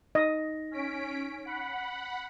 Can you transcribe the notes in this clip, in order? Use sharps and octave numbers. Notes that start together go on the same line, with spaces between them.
D#4 D#5 A#6
C#4 B6 D7
F#5 B5